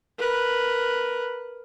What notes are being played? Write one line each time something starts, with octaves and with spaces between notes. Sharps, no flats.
A#4 B4